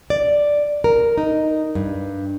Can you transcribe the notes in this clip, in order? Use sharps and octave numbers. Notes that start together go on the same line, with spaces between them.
D5
A#4
D#4
G2